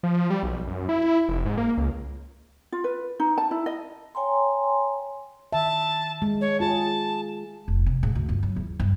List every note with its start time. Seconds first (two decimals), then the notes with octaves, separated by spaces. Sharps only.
0.03 F3
0.30 G3
0.43 B1
0.67 F#2
0.89 E4
1.29 F1
1.46 G#2
1.57 A#3
1.77 C#2
2.72 F4
2.84 B4
3.20 D#4
3.38 A5
3.51 E4
3.66 D#5
4.15 C#5 G5 G#5 A#5 C6
5.53 D#3 E5 A5
6.22 G#3
6.41 C#5
6.60 F4 G#4 A5
7.68 F1
7.86 C3
8.03 G#2
8.15 D2
8.29 G1
8.43 F#3
8.56 E2
8.80 G2